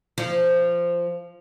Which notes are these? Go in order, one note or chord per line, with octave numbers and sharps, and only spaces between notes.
F3